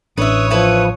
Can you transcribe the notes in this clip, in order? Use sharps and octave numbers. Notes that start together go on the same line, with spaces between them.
A1 D4 B4 C#5 E5 D#6
F3 E4 B4